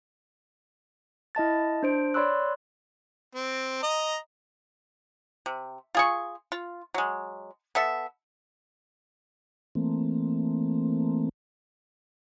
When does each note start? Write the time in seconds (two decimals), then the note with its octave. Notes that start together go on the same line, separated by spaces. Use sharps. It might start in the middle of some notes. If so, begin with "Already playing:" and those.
1.35 E4 D#5 A5 A6
1.83 D4 C5 D7
2.14 C#5 D5 B5 C6 E6 F#6
3.35 C4
3.83 D#5 A#5
5.46 C3
5.95 F4 G#4 C#6
6.52 F4
6.94 F#3 G#3
7.75 B3 A4 E5
9.75 E3 A3 A#3 C4